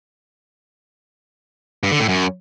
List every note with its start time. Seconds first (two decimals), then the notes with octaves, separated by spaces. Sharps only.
1.83 G2
1.92 D3
2.00 A2
2.09 F#2